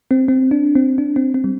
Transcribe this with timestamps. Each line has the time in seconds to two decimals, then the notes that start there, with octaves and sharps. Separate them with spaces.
0.11 C4
0.28 C4
0.51 D4
0.75 C4
0.98 D4
1.16 C4
1.34 C4
1.44 G3